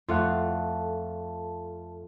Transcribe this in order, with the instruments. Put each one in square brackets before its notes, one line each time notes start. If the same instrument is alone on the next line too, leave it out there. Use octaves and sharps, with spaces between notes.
[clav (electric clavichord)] F2 A3 F#5 [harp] F4 [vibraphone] A4 A5